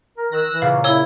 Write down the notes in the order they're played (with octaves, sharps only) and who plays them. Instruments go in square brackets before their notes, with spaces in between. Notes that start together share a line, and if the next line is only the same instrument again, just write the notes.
[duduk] A#4
[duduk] D#3 [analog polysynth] E6 F#6 A#6
[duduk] E3
[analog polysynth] A#2 C#3 [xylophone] F5
[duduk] E4 [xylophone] C#5 E6 G7